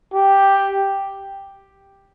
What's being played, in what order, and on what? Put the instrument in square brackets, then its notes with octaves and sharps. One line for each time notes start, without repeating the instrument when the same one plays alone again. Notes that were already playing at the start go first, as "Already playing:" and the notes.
[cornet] G4